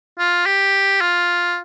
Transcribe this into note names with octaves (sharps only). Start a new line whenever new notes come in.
F4
G4
F4